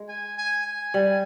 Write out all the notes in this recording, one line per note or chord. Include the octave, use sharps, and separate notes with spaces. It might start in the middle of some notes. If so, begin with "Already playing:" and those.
Already playing: G#3
G#5
G#5
G#5
G3